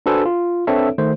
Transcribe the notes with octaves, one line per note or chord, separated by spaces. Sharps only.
D4 F#4 A4 B4 C5 G#5
F4
C4 D4 A4 B4 C#5 E5
D#3 A3 C5